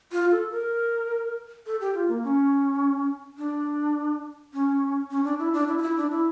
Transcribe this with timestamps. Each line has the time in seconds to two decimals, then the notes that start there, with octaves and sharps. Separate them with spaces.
0.12 F4
0.31 A4
0.51 A#4
1.66 A4
1.81 G4
1.94 F4
2.08 A#3
2.24 C#4
3.38 D4
4.53 C#4
5.11 C#4
5.24 D4
5.39 E4
5.54 D4
5.68 E4
5.78 F4
5.82 E4
5.97 D4
6.11 E4